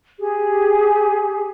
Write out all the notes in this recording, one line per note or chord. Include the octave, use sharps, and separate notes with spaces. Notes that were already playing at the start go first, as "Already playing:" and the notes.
G4 G#4